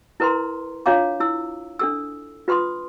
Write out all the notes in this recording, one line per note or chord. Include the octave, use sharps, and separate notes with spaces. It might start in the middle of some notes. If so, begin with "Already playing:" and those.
E4 A#4 B4 A#5 C6
D4 F4 C#5 F5 A#5 D6
E4 E6
D4 A4 E6
F4 B4 B5 C6 D#6